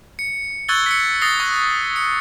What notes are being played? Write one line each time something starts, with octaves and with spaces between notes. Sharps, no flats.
C#7
C#6 E6 F#6 G#6 A6 G7
B6 C#7
D#6 A6 A#6 C7 G7
C#6 F#6
C#7